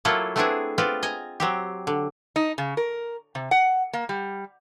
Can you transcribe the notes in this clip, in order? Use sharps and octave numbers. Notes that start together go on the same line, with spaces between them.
F#3 A3 A#3 E4 F4 A4
A3 B3 C4 D4 E4 G#4
B3 C4 F4 D5
D#5 G#5 A#5
F#3 C4 G4
D3
D#4
C#3
A#4
C3
F#5
A#3
G3